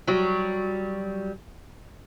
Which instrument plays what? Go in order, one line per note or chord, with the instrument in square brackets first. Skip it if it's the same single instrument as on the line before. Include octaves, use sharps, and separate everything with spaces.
[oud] F#3 G3 F#4